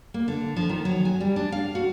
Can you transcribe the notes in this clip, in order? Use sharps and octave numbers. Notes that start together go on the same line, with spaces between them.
A#3
D3
F3
D#3
F#3
G#5
G3
D4
F5
F#4